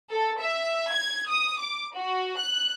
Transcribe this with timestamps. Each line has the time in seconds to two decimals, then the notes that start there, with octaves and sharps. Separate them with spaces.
0.11 A4
0.41 E5
0.92 G#6
1.30 D#6
1.60 D6
1.96 F#4
2.39 F#6